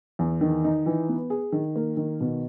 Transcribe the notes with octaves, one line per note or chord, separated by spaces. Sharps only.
E2
D#3
D#4
E3
B3
G#4
D#3
A#3
D#3
B2